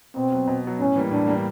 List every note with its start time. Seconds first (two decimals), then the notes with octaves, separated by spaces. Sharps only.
0.16 B2 C4
0.32 F#3 B3
0.47 B2
0.64 F#3 B3
0.80 A2 C#4
0.96 E3 G3 A#3
1.11 A2 D4
1.27 E3 G3 A#3